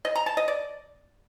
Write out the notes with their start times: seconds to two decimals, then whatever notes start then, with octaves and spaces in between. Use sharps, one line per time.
0.05 D#5
0.16 A#5
0.26 A5
0.37 D#5
0.48 D5